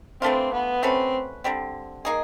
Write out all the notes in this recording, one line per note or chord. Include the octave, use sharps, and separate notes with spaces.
E3 A3 C4 D4 F4
B3
A3 C4 C#4 F#4 B4
D3 G3 C4
A#3 D#4 G#4